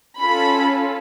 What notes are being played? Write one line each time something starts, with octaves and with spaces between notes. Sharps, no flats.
C#4 F4 A4 B5